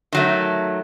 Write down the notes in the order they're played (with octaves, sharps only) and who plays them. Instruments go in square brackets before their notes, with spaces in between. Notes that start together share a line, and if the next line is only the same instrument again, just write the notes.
[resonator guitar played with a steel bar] D#3 F#3 A3